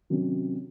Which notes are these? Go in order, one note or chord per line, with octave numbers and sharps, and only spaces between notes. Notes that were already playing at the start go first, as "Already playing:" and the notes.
C3 D#3 F#3 C#4